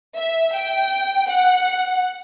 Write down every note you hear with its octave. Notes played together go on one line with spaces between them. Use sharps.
E5
G5
F#5